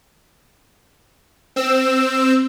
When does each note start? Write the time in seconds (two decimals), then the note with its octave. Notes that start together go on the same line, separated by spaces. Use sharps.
1.56 C4 E6